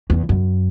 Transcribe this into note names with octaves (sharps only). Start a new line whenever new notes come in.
E2
F#2